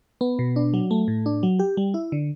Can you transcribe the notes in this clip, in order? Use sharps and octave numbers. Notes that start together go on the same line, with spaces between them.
B3
B2
D4
F#3
A3
A2
D4
F#3
G4
G3
E4
D3